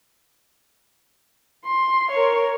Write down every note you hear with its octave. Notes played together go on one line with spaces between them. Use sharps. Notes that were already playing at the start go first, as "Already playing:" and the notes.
C6
A#4 C#5